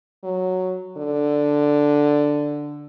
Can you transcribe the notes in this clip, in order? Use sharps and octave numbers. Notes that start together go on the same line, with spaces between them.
F#3
D3